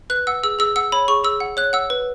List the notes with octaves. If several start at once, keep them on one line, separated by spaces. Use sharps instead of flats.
B4 F#6
F#5 E6
G#4 E6
G#4 E6
F#5 E6
C#5 B5
G#4 C#6
G#4 E6
F#5
C#5 F#6
F#5 E6
B4